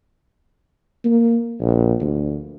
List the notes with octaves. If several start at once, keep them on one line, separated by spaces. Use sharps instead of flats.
A#3
A#1
D2